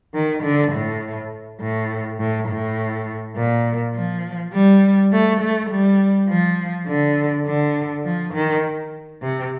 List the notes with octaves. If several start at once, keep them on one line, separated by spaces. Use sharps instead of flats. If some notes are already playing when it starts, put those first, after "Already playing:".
D#3
D3
A2
A2
A2
A2
A#2
F3
G3
A3
A3
G3
F3
D3
D3
F3
D#3
C3